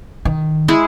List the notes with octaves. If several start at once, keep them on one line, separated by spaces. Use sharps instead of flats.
D#3
G#3 E4 G#4